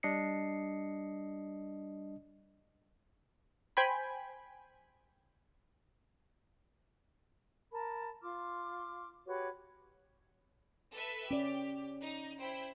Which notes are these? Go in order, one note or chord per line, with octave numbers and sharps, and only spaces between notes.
G3 D4 D#5 C7 C#7
C5 G5 G#5 B5
A#4 A5 B5
F4 C6 D6 F6
F#4 G4 B4 C#5
A4 B4 E5
C#4 G4 D5
D#4
E4 C5 G5